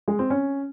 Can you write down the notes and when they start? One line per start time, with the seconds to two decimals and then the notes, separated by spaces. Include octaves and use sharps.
0.08 G#3
0.19 C4
0.30 C#4